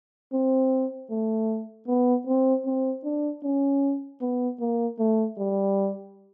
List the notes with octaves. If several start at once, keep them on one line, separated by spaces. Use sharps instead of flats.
C4
A3
B3
C4
C4
D4
C#4
B3
A#3
A3
G3